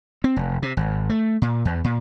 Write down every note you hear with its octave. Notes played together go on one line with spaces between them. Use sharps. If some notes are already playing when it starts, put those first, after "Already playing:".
C4
F1
C3
G#1
A3
A#2
E2
A#2